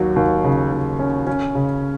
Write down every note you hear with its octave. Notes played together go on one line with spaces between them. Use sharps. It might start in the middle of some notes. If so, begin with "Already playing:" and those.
Already playing: D#2 F#3
D#2
C#3
D#2
C#4
C#4
C#3